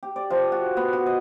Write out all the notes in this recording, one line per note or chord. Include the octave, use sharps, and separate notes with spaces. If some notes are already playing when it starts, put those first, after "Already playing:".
G4
D5
F3
F#4
B3
F#4
D#5